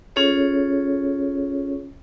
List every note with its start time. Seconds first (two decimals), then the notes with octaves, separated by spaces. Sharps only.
0.16 C#4 F4 G#4 A4 C#5